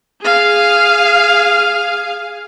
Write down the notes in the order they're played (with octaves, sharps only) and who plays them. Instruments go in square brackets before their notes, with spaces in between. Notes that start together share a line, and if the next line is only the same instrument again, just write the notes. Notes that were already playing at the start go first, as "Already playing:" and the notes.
[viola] G#4 F5